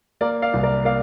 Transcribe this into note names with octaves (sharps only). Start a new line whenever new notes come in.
A#3 A#4 D5
D5 F5
C2
A#4 D5
A#3 D5 F5